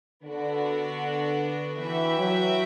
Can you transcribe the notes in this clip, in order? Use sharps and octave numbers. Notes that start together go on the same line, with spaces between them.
D3 B3 D4 F#4
E3 F#4 B4 E5 G5
F#3